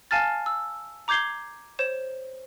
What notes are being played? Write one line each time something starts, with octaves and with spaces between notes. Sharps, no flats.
F5 G#5 A5 F6 A6
E6
A#5 D6 G6 G#6 C7 G7
C5 C#5 E7